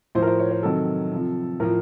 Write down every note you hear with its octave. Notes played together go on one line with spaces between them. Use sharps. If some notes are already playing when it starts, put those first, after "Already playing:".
A2 F3 C5
A#4
C5
C#5
C5
C3 D#3 F#3 A4
C3 F3
A2 F3 A#4